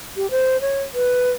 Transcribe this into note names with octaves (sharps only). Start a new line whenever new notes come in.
G4
C5
C#5
B4